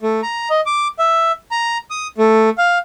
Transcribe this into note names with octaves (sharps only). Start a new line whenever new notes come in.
A3
A#5
D#5
D6
E5
A#5
D#6
A3
F5